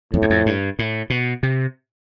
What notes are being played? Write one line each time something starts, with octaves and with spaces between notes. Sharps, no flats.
F2 A2
E2
F2
G2
A2
B2
C3